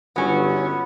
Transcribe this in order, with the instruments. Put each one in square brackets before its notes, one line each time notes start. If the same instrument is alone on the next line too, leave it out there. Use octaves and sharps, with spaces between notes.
[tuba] G1 [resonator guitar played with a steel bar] F#3 C#4 [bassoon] B3